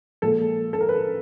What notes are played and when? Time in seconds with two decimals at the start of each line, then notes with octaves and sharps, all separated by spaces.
0.22 A#2 F3 G#3 A4
0.73 A4
0.81 A#4
0.89 B4